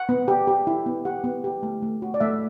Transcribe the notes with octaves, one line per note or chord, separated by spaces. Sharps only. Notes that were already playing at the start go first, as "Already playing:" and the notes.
Already playing: F#5
B3
G4
G4
E4
B3
G4 F#5
B3
G4
A3
A3
F#4
D5
A3 E5